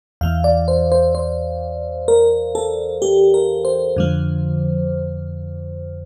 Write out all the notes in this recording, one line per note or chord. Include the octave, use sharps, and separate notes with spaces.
E2 E3 F5
D5
C5
C5
C5
A#4
A4
G4
A#4
C5
F2 D3 F3